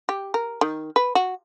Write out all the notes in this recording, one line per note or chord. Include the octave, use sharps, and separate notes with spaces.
G4
A#4
D#3
B4
F#4